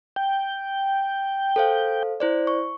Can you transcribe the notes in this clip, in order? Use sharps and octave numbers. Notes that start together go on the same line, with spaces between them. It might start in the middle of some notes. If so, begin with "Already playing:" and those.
G5
A4 C5 F5
E4 C5 D5
C#6